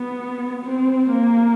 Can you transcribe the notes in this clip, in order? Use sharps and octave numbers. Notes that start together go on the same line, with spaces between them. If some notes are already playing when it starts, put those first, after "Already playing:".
Already playing: B3
C4
A#3